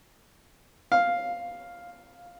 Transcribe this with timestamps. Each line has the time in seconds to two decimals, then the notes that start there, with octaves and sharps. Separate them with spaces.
0.92 F5